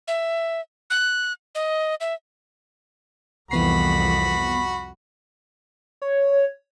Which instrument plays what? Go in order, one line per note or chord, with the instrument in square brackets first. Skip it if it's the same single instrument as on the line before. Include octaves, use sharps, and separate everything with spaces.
[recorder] E5
F#6
D#5
E5
[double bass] C2 F2 [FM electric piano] E3 B3 C7 [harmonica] F#4 B5
[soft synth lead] C#5